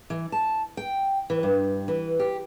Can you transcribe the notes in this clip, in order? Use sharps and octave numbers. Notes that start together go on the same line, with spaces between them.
E3
A5
G5
E3
G2
E3
G4